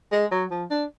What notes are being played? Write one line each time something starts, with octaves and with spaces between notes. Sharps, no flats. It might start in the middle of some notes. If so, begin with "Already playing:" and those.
G#3
F#3
F3
D4